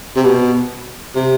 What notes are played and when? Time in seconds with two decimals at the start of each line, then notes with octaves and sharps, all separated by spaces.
0.16 C3
0.24 B2
1.15 C3